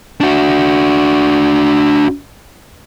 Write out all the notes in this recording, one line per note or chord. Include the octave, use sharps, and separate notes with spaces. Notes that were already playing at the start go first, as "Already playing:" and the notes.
D4 F#4